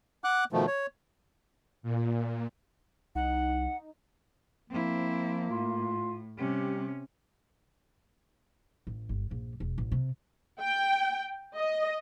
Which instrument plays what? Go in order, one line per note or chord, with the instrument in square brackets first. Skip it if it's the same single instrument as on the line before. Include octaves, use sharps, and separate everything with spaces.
[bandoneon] F#5 D6 F#6
B2 D#3 F3 A3
C#5
[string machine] A#2
[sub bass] C2 [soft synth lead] D#4 [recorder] F#5
[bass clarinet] F3 [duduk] A#3 [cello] C4 E4
[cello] A2 [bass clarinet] F4
[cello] C3 C#4 [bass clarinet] G3 [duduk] G4
[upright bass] A1
G1
A#1
E1
A1
C3
[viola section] G5
D#5